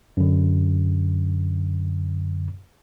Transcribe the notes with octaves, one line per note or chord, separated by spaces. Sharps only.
F#2 D3